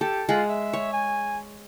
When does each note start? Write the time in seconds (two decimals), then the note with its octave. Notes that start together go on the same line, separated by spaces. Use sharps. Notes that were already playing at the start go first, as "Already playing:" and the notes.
0.01 G4 A4
0.29 G#3 F4 F#5
0.49 E5
0.73 C#5
0.93 G#5